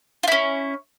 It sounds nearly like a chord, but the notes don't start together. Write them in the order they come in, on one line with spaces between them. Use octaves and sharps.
F4 E4 C#4